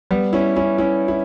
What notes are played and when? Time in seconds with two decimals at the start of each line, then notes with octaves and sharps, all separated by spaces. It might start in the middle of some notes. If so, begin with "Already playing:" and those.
0.11 G3 B3
0.33 C#4 E4
0.56 C#4 E4
0.78 C#4 E4
1.08 E4